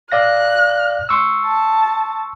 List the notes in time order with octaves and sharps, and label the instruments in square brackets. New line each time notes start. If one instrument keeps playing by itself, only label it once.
[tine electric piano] D5 F5 A#6 [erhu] F#6
[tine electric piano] C6 C#6 E6
[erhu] A5